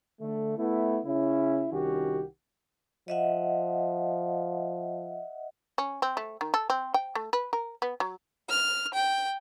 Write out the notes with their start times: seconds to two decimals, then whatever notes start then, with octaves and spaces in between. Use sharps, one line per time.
0.21 D3 A3
0.58 A3 B3 E4
1.05 C#3 C#4 E4
1.72 C2 D#3 C#4 F#4 G4
3.08 F3 D#5 E5 F#5
5.78 C#4
6.02 C4
6.17 A3
6.41 D#3
6.54 A4
6.70 C4
6.94 G5
7.15 A3
7.33 B4
7.53 A#4
7.82 B3
8.00 F#3
8.50 F6
8.94 G5